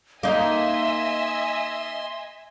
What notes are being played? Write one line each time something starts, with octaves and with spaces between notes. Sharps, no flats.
A#3 D#4 D#5 E5 G#5 C6 E6